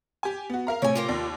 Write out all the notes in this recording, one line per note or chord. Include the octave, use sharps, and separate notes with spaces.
G4 G#5
B3 F#4
A#4 F5 A#5
A2 C3 C#5 G#5
F4 G4 A#4
D#2 D5